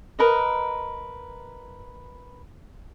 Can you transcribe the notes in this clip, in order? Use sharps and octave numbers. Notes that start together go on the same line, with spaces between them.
A#4 B4 D#5